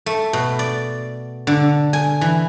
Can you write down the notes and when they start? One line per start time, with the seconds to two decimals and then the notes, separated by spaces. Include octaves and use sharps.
0.06 A3
0.33 B2
0.59 D5
1.47 D3
1.93 G#5
2.21 E3